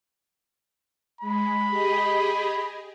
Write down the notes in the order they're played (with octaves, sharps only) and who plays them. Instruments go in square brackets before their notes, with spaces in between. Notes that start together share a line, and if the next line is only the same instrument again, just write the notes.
[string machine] G#3 [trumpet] B5
[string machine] G4 G#4 D#5